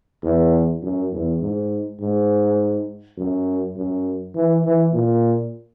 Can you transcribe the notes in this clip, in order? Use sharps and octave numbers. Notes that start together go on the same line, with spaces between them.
E2
F#2
E2
G#2
G#2
F#2
F#2
E3
E3
A#2